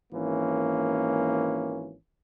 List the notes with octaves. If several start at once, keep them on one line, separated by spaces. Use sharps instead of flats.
G#1 E3 A#3 C#4